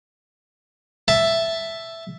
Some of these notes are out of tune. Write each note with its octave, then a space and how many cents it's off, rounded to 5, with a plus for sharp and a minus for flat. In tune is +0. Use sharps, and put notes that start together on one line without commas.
E5 +5 A5 +0